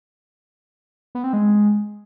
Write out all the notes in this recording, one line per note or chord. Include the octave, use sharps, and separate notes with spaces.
B3
C4
G#3